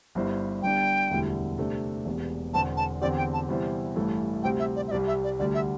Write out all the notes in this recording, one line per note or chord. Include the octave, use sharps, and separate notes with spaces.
G1 G2 G3 E4 C5
G1 G2 G3 D4 G5
E1 D2 D3 G3 E4
C3 A3 D4
E1 E2 C3
E1 E2 D3 C4 A5
A5
E2 D3 C4 G4 D5
G5
A5
E2 C3 G3 E4 C5
A1 G2 E3 A3 E4
D2 C3 G3 C4 G5
E5
D5
E5
C2 C3 G3 D5
E5
D5
D2 D3 G3 D5
E5